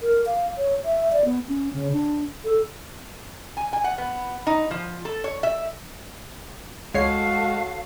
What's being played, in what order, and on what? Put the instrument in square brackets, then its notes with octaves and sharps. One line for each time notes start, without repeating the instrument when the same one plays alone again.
[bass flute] A#4
F5
C#5
E5
D5
B3
C#4
C#3
D4
A4
[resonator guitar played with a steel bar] G#5
G#5
F#5
B3
D#4
F3
A4
C#5
E5
[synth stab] C#2 C#5 C7 [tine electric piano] G#3 [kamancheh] F#4 A4 [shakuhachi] F5